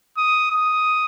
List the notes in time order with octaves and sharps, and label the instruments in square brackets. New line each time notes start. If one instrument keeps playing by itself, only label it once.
[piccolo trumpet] D#6
D#6